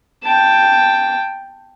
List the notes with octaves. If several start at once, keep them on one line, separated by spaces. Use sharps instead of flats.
G5 A5